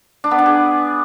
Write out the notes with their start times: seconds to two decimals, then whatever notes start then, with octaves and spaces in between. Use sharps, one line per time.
0.24 D4
0.31 B3
0.38 D4
0.46 G#4